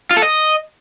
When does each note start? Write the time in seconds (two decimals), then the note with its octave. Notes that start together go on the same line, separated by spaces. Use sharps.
0.11 F4
0.17 A4
0.22 D#5